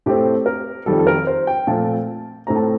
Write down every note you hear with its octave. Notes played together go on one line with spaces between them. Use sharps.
A2 A3 C4 G4
A#4
F2 D#3 G3 A4
A4
A#4
C5
G5
A#2 F3 A3 C4 A5
A2 A3 C4 A#5
A5